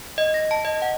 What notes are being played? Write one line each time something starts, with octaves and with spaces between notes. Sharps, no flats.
D#5
A#6
A5
D#5
F#5